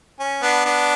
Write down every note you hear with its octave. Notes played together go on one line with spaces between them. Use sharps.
C#4
B3 D4
B3 D4